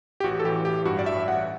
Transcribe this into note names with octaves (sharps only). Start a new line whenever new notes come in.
G4
A1 F#4
A4
E3 G4
A1 G4
G2 F#4
D5
A1 E5
A1 F#5